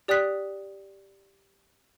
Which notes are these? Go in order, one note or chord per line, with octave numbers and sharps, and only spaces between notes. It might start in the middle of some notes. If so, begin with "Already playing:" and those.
G4 D5 G5 D#6 F#6 B6